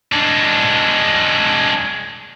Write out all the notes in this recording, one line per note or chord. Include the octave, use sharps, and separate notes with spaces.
G#3 D4